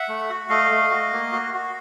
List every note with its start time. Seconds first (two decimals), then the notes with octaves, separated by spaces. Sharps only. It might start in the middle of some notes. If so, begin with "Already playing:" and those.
Already playing: E5 F#5
0.08 A3
0.30 F#4
0.49 A3 D#5 F5
0.71 A3
0.91 F#4
1.13 A#3
1.32 F#4
1.54 F#4